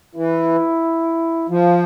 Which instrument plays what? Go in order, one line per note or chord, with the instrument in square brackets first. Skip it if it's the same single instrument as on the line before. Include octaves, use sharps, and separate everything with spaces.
[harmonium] E3 [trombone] E4
[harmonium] F3 [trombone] F4